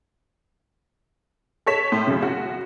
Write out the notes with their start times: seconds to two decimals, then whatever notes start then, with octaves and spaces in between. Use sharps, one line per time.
1.66 A4 C#5 B6 E7
1.92 A2 C6
2.07 F#2 C#3
2.22 F#4